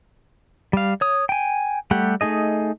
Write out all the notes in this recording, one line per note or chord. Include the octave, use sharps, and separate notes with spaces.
G3 F5
C#5 D#6
G5 G#5
G3 A3 G4 F#5
A3 D#4 G#4 D#5